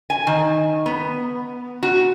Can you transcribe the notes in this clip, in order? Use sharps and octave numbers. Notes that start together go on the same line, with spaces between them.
G#5
D#3
B3
F#4